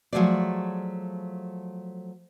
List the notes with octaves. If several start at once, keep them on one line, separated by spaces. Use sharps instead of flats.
F3 F#3 G#3 A3 G#4 D5